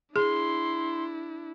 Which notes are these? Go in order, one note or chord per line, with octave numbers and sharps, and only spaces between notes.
D4 E4 G#4 C6